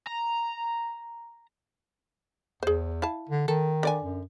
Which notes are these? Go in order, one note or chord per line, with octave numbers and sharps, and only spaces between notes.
A#5
E2 G#4 C5
E4 F5 A5
D3
D#3 A4
D3 D5 G#5
F#2